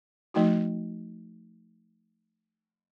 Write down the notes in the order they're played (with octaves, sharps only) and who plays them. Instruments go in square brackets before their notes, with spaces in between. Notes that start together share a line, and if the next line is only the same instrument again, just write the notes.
[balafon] F3 A3 D#4 F#4